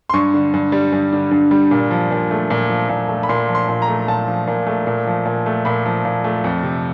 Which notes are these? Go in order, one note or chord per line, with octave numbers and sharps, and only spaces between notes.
C6
G2 C#6
D3
G2
G3
G2
D3
G2
G3
A#2
F3
A#2
A3
A#2
F3
A#2
A3
B5
A#2 C6
F3
C6
A#2
A#5
A3
A#2 A5
F3
A#2
A3
A#2
F3
A#2
A3
A#2 B5
F3
A#2
A3
F2
C3